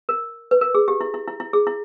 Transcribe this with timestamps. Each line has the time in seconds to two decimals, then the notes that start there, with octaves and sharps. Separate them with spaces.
0.09 A#4
0.51 B4
0.61 A#4
0.75 G#4
0.88 G4
1.01 E4
1.14 E4
1.28 E4
1.40 E4
1.53 G#4
1.67 E4